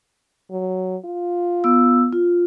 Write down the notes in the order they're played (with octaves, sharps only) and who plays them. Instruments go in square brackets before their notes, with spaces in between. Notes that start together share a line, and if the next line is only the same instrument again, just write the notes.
[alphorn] F#3
F4
[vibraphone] B3 E6
F4